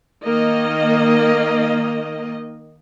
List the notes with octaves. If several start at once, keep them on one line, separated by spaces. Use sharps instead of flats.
D#3 A#3 D#5